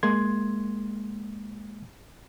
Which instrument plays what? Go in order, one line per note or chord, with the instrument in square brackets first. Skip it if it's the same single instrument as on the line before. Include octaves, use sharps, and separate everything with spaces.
[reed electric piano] G#3 A#3 C6 G#6